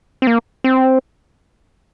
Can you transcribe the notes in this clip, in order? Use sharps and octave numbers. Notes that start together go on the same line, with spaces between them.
C4
A#3
C4